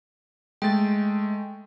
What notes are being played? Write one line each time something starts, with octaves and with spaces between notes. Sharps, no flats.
G#3 A3 G5 A6